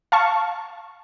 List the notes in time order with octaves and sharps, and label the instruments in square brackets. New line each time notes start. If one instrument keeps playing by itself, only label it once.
[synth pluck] F5 A5 C#6